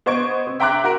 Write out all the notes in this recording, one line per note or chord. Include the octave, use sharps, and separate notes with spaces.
B3 C5 D#5 C#6 G#6 D7
C4
E5 G5 A#5 C6 D6 F#6
F#4 A#4